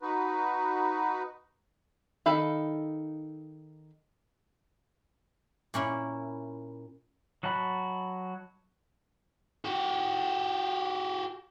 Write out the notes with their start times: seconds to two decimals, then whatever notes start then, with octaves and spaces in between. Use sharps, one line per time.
0.01 D#4 F#4 B4
2.26 D#3 D#4 A4 F5 B5
5.74 A#2 C#4 E4
7.43 F#3 F#4 D#5 A5 B5
9.65 F#4 G4